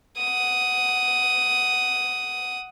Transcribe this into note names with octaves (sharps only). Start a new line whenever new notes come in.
F#5 D#6